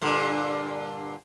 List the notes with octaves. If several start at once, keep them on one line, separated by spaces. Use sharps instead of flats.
G2 A#2 D3